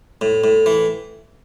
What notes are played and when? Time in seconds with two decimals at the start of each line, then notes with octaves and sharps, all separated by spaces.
0.21 A2
0.44 A2
0.66 E3